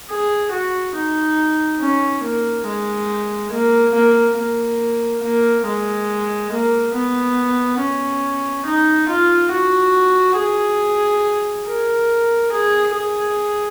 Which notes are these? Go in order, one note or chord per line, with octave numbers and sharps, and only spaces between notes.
G#4
F#4
D#4
C#4
A#3
G#3
A#3
A#3
A#3
A#3
G#3
A#3
B3
C#4
D#4
F4
F#4
G#4
A#4
G#4
G#4